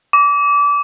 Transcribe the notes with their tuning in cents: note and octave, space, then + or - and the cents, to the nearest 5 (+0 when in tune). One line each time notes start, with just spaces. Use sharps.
D6 -25